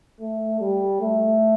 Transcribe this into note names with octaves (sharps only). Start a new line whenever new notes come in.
A3
G3
A3